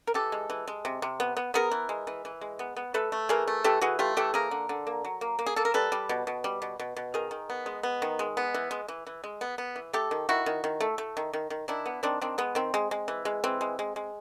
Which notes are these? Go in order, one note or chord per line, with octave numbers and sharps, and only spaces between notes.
A#4
E3 G4 A4
G#3
E3
G#3
C3
C3
B3
B3
B3 G#4 A#4
E3
G#3
E3
E3
G#3
B3
B3
A3 A4 B4
A3
E3 G#4 A#4
A3
E3 G4 A4
E3 F#4 G#4
A3 F4 G4
E3 G4 A4
A#3 G#4 A#4
D3
D3
A#3
F#3
A#3
A#3
G#4
A#3 A4
A#4
G3 A4 B4
G3
B2
B2
G3
B2
B2
B2
D#3 G#4 A#4
D#3
B3
G#3
B3
D#3
G#3
B3
E3
G#3
E3
E3
G#3
B3
B3
E3
A3 G4 A4
D#3
D#3 E4 F#4
D#3
D#3
A3
A3
D#3
D#3
D#3
D#3 D4 E4
B3
D#3 C4 D4
D#3 C4 D4
G#3 B3
D#3 C4
G#3
G#3
E3
G#3
E3 C4
G#3
G#3
G#3